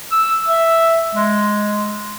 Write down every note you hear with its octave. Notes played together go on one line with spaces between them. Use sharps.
E6
E5
G#3